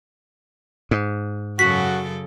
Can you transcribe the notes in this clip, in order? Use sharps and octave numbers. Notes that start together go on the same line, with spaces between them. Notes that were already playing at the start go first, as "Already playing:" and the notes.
G#2
F#2 C#3 F#4 A4 B6